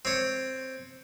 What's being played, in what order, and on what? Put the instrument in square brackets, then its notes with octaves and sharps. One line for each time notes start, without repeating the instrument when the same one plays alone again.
[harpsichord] C4 C#5